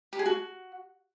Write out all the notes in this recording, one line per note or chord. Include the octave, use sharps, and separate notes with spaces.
G4
G#4
F#4